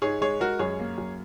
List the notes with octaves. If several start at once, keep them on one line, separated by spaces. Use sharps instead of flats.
G#2 G#4 C#5
G#3 G#4 C#5
G#3 F#4 A#4
F#2 G#4 C#5
A#3
F#2